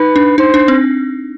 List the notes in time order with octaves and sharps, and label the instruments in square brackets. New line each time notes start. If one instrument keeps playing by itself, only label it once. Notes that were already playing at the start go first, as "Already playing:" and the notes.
Already playing: [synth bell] D#4 [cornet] B4
[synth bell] D4
[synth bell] D#4 [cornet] C5
[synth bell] D4
C4